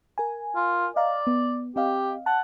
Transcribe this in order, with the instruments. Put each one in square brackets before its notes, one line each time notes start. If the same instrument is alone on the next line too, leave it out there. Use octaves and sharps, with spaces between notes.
[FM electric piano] A#4 G#5
[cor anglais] F4
[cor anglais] D5 [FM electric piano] D#5 F5 A#5
[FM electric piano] B3
[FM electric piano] C4 D#5 F5 [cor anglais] G4
[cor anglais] F#5 [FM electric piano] A5